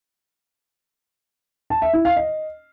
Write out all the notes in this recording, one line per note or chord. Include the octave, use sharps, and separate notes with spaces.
A5
E5
E4
F5
D#5